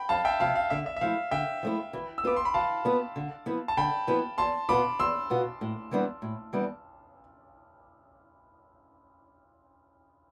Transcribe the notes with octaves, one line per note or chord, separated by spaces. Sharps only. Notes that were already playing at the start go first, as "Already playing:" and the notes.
Already playing: G5 B5
F2 F5 A5
E5 G5
C3 F3 F5 A5
F5
D3 E5
E5
E5
F3 A3 E4 F5
D3 E5 G5
F3 A3 E4
E3
E6
B3 F4 B4 D6
C6
B5
E3 F5 A5
B3 F4 B4
D3
F3 B3 E4 B4
A5
D3 G5 B5
F3 B3 E4 B4
E2 A5 C6
B2 B3 F4 B5 D6
E2 C6 E6
B2 B3 F4
A2
E3 G3 B3 D4
A2
E3 G3 B3 D4